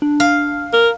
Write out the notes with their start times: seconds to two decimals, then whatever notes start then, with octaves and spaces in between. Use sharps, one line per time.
0.02 D4
0.20 F5
0.73 A#4